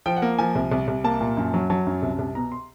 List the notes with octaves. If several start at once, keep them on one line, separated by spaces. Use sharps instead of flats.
F3 G5
F#5
A#3
F3 G#5
C2
C2
C2
A#3 A5
A#2
F#2
F#3
F#3 A5
F#2
C2
C2
B2 A#5
C6